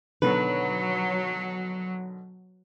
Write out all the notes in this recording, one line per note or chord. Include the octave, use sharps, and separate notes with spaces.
B2 D3 D#3 F#3 B4